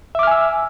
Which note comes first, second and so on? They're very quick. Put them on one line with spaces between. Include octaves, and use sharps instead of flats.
E5 D6 F6 G#5 E6